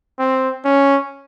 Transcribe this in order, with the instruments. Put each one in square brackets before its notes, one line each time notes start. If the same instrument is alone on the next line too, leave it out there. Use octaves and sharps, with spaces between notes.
[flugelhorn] C4
C#4